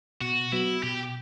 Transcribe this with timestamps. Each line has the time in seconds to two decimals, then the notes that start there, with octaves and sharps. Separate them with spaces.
0.21 B2 F#4
0.52 F#3 B3 E4 F#4
0.83 B2 G4